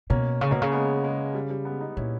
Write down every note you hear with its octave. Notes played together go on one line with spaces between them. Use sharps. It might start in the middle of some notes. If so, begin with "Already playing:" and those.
B2 A#3 C#4
C#3
B2 A#3 C#4
C#3
G#3 B3
G#3
G3
G3
G#3 B3
B3 D#4
A#2 C#4 E4